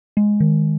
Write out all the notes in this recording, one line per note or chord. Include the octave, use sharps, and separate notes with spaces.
G#3
D#3